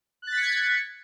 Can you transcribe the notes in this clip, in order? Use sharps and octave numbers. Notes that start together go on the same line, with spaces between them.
F#6 G#6 A6 B6 C#7